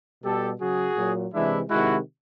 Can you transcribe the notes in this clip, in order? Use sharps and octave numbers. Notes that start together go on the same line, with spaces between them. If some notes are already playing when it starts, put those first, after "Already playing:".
B2 G3 G4 A4
C#3 F#3 F#4 G#4
A#2 F#3
C3 E3 G#3 D4 E4
C3 D#3 G#3 E4 F#4